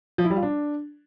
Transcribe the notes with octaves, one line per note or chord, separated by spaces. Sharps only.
F3
E4
G3
F4
D4